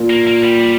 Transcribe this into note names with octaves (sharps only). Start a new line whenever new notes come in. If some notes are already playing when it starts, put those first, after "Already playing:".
Already playing: A#2
A#3
A#3
G3